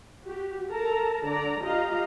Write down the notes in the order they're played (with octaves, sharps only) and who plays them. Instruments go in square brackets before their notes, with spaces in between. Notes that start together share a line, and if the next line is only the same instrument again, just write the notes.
[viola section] F#4 G4
A4 A#4 A5 A#5
D3 D5 A#5
F4 G4 D#5 F5 A#5